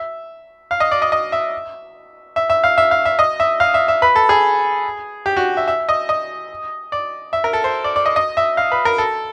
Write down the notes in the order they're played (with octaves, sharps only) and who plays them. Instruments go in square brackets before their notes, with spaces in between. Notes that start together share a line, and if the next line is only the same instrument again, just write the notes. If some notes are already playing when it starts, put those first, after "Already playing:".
Already playing: [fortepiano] E5
F5
D#5
D5
D#5
D#5
E5
E5
E5
F5
E5
F5
E5
D#5
E5
F5
E5
E5
B4
A4
G#4
G4
F#4
E5
E5
D#5
D#5
D5
E5
A#4
A4
C5
D5
D5
D#5
D#5
E5
F5
B4
A#4
A4